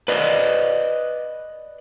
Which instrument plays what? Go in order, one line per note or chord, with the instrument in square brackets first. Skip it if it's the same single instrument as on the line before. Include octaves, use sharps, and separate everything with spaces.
[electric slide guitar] B4 D5 D#5